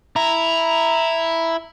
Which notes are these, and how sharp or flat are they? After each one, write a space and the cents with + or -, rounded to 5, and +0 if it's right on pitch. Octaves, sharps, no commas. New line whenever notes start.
E4 +0 A#5 +0